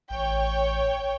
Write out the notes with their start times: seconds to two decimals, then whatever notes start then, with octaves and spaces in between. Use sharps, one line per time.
0.10 A1 C#5 G5